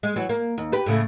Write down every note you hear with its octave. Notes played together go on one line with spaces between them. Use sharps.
G#3
E3 F#3
A#3
D#2
G4 B4
A2 C#3 A3